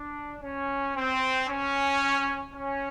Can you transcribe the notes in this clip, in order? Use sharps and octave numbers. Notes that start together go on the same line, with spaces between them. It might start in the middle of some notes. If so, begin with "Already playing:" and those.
Already playing: D4
C#4
C4
C#4
C#4